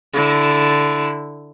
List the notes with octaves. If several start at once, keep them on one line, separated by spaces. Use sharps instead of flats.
D3 E4